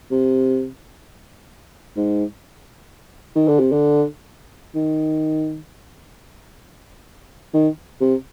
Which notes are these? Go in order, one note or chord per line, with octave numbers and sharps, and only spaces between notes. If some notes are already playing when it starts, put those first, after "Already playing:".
C3
G#2
D#3
D3
C3
D3
D#3
D#3
C3